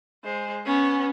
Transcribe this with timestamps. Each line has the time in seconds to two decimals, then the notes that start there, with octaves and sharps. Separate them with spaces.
0.24 G#3 C5
0.66 B3 C#4